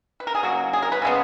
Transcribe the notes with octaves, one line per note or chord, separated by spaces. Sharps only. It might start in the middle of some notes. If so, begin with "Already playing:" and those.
B4
A#4
G#4
C#3 F#3 A#3 F#4
G#4
A#4
B4
C#3 G#3 B3